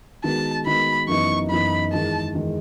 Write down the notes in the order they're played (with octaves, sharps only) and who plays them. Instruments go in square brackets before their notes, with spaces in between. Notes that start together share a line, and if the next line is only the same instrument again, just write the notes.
[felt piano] D#3 G#3 B3 F#4 [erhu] A5
[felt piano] D#3 G#3 B3 F#4 [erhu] B5
[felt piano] F#2 E3 B3 D#4 [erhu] C#6
[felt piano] F#2 E3 B3 D#4 [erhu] B5
[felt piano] E2 D#3 G#3 [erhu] A5
[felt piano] E2 D#3 G#3